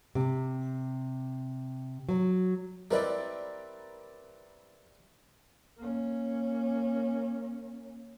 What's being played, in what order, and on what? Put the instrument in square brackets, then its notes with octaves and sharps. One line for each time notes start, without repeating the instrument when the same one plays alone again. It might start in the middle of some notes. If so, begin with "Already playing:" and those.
[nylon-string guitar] C3
F#3
[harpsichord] G3 C4 E4 [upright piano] A#4 B4 D5
[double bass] A#3 C#4